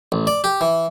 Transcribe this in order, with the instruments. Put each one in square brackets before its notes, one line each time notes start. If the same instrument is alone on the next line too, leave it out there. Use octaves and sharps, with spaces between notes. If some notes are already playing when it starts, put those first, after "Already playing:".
[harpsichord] A1
D5
G4
E3